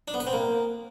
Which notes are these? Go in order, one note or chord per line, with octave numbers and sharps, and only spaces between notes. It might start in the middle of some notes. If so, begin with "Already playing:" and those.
D4
B3
B4
C4
A#3